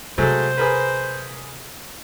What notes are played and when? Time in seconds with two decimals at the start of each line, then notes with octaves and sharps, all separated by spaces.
0.18 C3 F#3 G#3 A3 C5
0.58 G#4 A#4 B4